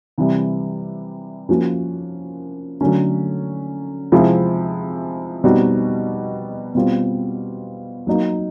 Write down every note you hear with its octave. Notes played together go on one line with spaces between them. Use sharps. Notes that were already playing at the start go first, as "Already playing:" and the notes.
C3 E3 G3
F3 A#3 C#4 F#4
D3 F#3 A3 C#4
C3 F3 G#3 C4 E4
B2 G3 C4 D#4 F#4
B2 G3 C4 F4
F#3 A#3 D#4